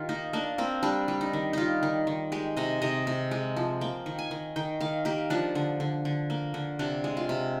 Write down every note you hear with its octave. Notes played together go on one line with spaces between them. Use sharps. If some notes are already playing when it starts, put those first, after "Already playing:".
Already playing: D#3 F4 G4
A#3 D#4
A#3 D4
A#3 C4
G3 D4
G3
D#4
D#3
G3 D#4 F4
D#3
D#3
G#3 G4
C3 D#5
C3 D#5
C3
G#3
F3
A#3 G5
D#3
G#5
D#3
D#3 G5
D#3 F5
A#3 G4
F3 D4
D3
D3
D3
A#3
D3
C3 D4
G#3
F4
C3